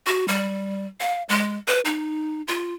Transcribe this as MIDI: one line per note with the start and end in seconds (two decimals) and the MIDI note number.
0.07 0.27 66
0.28 0.86 55
1.00 1.23 77
1.29 1.58 56
1.68 1.81 71
1.85 2.42 63
2.48 2.74 65